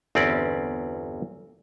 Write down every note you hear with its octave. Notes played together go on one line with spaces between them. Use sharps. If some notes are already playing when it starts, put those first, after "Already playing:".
G1 E2 C4 C#4 D5